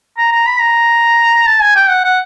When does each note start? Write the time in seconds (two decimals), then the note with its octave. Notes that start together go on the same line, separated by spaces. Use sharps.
0.18 A#5
0.32 A#5
0.47 B5
0.60 A#5
1.47 A5
1.61 G#5
1.76 G5
1.89 F#5
2.04 F#5